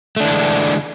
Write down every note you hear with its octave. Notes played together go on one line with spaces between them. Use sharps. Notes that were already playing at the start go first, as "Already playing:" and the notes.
D3 E3 G#3 A3 D4